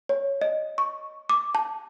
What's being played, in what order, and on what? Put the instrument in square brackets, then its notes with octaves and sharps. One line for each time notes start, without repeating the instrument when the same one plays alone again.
[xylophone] C#5
D#5
C#6
D6
A5